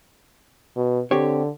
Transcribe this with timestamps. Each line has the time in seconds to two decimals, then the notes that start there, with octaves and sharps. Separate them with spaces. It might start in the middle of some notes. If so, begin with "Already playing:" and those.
0.76 B2
1.11 D3 C4 G4 C#5